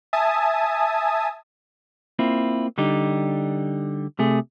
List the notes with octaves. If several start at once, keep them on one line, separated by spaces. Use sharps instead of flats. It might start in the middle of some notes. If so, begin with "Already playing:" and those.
E5 G#5 A5 D#6
A#3 C4 E4 F4
D3 G3 D#4 G4
C3 A3 G#4